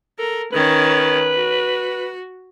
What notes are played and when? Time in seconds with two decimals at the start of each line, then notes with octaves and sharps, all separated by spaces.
0.19 A4 A#4
0.52 D#3 C#4 B4
1.35 F#4